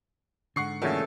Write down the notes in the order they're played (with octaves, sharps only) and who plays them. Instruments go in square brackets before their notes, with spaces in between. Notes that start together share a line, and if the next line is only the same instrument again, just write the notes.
[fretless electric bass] G#2 D3 [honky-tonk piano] F#5 C#6 C7
[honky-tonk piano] E2 C#4 [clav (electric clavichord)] A#2 C#3 A3 [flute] A4